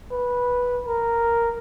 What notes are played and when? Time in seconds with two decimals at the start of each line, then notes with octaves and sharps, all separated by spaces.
0.12 B4
0.86 A#4